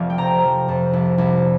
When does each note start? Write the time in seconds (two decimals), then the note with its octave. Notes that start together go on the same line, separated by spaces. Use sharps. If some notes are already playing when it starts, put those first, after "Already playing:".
Already playing: F1 F2 F3 D5 F5
0.10 G5
0.18 C3 A#5
0.44 F3
0.68 F2
0.93 C2
1.18 C2